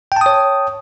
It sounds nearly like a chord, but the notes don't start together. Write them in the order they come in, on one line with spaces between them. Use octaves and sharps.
G5 A5 D#6 C#5